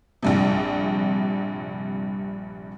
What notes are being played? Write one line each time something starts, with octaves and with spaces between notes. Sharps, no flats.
A#1 G2 C3